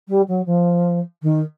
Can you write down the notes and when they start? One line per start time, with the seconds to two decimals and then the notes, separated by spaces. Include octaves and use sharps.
0.09 G3
0.28 F#3
0.46 F3
1.23 D#3